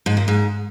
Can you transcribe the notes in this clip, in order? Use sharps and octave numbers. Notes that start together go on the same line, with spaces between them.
G#2
A#2
G#2